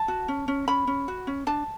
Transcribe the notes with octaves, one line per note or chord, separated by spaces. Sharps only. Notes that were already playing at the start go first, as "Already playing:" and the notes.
Already playing: A5
F#4
C#4
C#4
C#4 B5
C#4
F#4
C#4
D4 A5